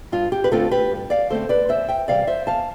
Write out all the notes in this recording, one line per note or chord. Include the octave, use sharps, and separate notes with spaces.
G2 F4
G4
B4
D3 A3 C4 F4 A4
G4 B4
G2
D5 F5
D3 A3 C4 A4 C5
B4 D5
E2 C5 E5
E5 G5
C3 E3 G3 D5 F5
C5 E5
E2 F5 A5